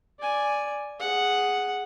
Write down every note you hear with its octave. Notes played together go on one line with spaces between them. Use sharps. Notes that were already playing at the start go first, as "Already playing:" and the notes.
D5 G#5
G#4 F#5